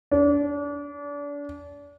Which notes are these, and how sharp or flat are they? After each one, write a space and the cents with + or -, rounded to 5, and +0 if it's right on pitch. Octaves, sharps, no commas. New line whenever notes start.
D4 -30